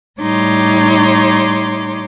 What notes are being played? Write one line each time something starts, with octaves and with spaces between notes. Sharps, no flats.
A2 G3 D#4 C#5 C6 D6